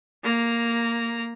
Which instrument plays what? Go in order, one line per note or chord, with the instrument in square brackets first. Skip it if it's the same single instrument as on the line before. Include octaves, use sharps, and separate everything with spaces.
[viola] A#3 A#5